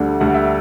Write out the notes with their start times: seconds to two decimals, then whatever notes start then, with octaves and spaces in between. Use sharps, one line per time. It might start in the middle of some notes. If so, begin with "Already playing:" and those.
Already playing: D2 D3 G3
0.20 D2 D3 G3 F#5
0.34 E5